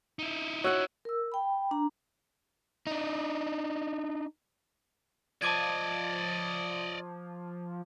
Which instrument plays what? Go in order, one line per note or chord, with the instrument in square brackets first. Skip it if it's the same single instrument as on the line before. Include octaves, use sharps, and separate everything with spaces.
[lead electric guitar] D#4 E4
[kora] F#4 F#5 [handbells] C#5 E6 F#6
[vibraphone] A#4 E6
G5 B5
D4 A#5
[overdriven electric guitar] D4 D#4
[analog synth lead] F3 [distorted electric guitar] D5 D#5 [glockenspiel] A5 D6 G#6